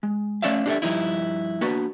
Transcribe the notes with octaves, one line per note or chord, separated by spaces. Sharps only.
G#3
A3 C#4 C#5 D5 E5 F5
D4 G4 A4 C#5 D5 E5
G2 F3 D#4 E4
A#3 B3 D4 F#4 B4